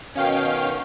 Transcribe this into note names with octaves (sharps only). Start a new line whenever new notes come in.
B2 D#3 C#4 F5 G5